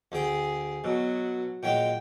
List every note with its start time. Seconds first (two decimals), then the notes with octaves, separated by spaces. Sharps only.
0.12 D2 G#4 G5
0.84 B2 F#3
1.63 A#2 F#3 G#3 G5